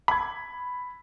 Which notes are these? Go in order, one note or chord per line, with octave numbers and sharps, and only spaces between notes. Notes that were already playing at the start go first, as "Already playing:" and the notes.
B5 G#6